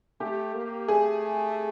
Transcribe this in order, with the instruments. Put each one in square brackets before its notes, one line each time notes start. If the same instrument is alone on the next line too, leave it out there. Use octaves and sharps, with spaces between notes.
[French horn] A3 [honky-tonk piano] G4
[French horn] A#3
[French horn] A3 [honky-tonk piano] G#4